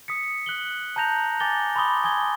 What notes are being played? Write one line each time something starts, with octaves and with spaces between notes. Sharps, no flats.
D#6 B6 C#7
F#6 F#7 G7
A5 A#5 G6 A#6 F7
G#5 A5 D6 A6 A#6 G7
B5 C6 D6 D#6 G7
G#5 D#6 G#6 G7